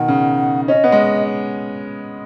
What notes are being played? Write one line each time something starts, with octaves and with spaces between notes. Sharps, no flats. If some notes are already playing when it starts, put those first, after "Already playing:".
Already playing: B2 D#3 F#5
C#3
C#4 D#5
B3
G#3